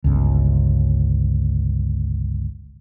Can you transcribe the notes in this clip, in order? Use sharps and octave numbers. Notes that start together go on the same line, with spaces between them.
G1 C#2